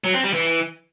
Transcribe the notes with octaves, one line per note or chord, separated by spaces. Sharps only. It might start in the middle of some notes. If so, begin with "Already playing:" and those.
F#3
C4
G3
E3